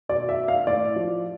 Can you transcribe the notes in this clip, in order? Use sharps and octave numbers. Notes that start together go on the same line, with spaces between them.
B2 D5
E5
F5
A2 D5
F3